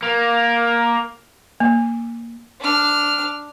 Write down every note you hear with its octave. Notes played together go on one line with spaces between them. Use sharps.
A#3
A#3
D4 F6